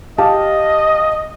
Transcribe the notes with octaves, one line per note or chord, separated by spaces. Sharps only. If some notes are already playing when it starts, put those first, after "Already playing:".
G4 D#5 F5 A5